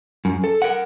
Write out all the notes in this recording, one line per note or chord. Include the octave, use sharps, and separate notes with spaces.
F#2
A4
A#4 F#5